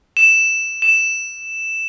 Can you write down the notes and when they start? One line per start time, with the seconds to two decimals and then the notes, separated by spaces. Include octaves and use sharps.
0.17 E7
0.82 E7